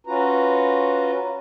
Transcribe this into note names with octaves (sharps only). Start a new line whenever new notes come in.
C#4 F4 F#4 B4 A#5